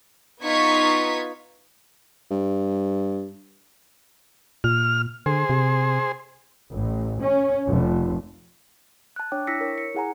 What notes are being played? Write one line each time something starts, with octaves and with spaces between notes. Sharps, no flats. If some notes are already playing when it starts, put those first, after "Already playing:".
B3 D#4 F4 C#6 G#6 B6
G2
A#2 F6
D3 G#4 C5
C3
A1
C#4
F1
A5 F#6
D4 C#5 G5 D6
E4 E6 A#6 B6 C#7
A#4 C#5
C#7
E4 G#4 F#5 G#5 A#5